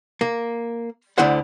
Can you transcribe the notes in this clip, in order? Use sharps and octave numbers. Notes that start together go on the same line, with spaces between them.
A#3
D2 D3 E4 C5 F#5